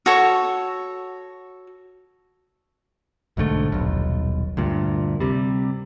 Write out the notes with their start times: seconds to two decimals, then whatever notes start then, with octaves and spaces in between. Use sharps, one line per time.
0.06 F#4 A4 C#5
3.37 B1 G#2 D3 A3
3.72 D#1 B1
4.57 D2 G2 A#2
5.21 C3 G3